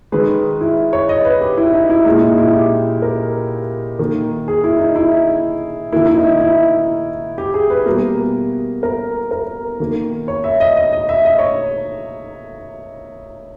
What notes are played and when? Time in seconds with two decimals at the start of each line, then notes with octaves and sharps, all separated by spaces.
0.12 D#3 G#3 B4
0.61 E4
0.93 C#5
1.09 D#5
1.25 B4
1.41 G4
1.58 E4
1.73 D#4
1.90 E4
2.05 A#2 G#3 E4
2.21 D#4
2.38 E4
2.54 G4
3.02 A#4
3.99 D#3 A#3
4.48 G#4
4.64 E4
4.79 D#4
4.96 E4
5.92 D#3 A#3 E4
6.07 E4
6.17 D#4
6.41 E4
7.38 G4
7.54 G#4
7.70 B4
7.86 B2 G3 A#3 A#4
8.83 A#4
9.31 A#4
9.80 D#3 A#3
10.28 C#5
10.44 E5
10.60 D#5
10.77 D#5
10.93 D#5
11.09 E5
11.25 D#5
11.38 C#5